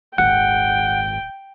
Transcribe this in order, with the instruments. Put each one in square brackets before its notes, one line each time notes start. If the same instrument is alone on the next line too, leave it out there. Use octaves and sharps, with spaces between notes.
[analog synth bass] D#1 [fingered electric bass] G#1 [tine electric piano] F#5 [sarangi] G5